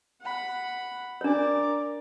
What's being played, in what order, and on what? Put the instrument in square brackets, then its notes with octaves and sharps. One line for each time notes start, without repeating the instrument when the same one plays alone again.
[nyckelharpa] F#5 B5
[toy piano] D4 C#5 [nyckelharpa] A#4 D5